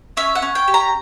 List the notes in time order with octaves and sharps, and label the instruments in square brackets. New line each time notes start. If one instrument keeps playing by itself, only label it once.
[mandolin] C#4 E5
F#5
C#4
G5
G4
A#5